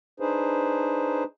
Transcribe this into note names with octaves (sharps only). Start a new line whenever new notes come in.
D4 D#4 G#4 B4 C5